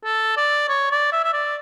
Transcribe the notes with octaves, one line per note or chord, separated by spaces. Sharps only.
A4
D5
C#5
D5
E5
E5
D5